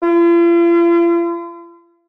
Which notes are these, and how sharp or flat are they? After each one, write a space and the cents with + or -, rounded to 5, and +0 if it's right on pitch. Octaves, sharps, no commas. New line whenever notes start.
F4 -45